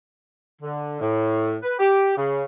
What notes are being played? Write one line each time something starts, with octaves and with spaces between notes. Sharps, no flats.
D3
A2
B4
G4
C#3